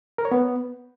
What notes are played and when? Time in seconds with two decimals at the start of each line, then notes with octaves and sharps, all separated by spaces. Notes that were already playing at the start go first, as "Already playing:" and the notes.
0.18 A#4
0.25 C#5
0.32 B3